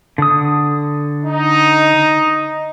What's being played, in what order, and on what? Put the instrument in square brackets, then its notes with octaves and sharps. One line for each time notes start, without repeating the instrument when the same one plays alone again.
[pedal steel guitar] D3 D#6
[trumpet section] D#4